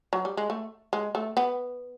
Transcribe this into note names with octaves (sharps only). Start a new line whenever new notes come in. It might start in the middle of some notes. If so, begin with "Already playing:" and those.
F#3
G3
G#3
A3
G#3
A3
B3